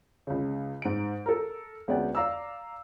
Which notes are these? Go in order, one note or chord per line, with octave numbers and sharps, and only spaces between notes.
C#2 C#3
G#2 D7
A4 A#4
D2 G#3 B3 C#4 D5 G5
D5 F5 A#5 D6 E6